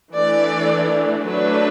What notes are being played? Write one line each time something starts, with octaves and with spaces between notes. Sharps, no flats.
E3 A3 D4 D5
F#3 A3 D4 B4